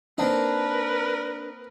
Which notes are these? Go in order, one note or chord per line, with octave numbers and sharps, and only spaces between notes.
A#3 C4 D4 D#4 A#4 B4